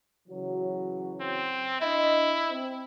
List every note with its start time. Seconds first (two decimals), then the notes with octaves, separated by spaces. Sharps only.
0.28 C#3 E3 F#3
1.21 C4
1.81 D4 E4 D#5
2.49 C4